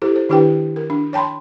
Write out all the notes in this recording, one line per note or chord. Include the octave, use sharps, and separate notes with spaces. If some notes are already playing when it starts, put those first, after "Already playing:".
E4 G4 A4 C5
C5
D#3 D4 E4 G4 B4 G5
A#4
D4
C#5 G5 A5 B5 C6